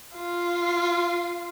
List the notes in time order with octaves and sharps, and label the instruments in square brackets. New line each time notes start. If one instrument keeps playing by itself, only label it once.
[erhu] F4